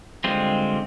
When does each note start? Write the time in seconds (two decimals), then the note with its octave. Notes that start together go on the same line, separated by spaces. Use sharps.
0.24 D3 G3 G#3 C4 F4